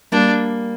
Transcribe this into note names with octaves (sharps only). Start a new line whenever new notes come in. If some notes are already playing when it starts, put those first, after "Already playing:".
G3 A#3 D4